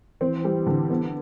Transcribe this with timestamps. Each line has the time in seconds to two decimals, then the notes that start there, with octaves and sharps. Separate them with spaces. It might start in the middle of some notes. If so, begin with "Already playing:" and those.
0.21 E3 C4
0.45 G3
0.66 D3
0.90 B3